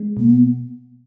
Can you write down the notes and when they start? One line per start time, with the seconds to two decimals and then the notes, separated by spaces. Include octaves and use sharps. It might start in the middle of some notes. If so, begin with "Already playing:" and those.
Already playing: G#3
0.17 B2 A#3
0.30 B3